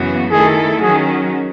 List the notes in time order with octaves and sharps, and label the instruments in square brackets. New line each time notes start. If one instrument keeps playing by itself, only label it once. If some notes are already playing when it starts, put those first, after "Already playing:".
Already playing: [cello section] F#2 C#3 E3 B3 F#4
[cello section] D#3 A3 E4 A4 [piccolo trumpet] G#4
[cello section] D#3 F#3 C#4 F#4 [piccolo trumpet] G#4